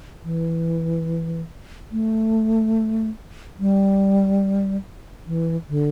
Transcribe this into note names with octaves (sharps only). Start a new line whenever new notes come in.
E3
A3
G3
E3
D3